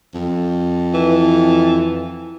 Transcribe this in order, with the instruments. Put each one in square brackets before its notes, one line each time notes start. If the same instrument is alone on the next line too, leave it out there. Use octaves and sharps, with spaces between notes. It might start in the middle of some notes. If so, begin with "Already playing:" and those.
[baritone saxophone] F2
[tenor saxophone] E3